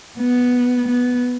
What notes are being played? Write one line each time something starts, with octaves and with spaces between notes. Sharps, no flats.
B3
B3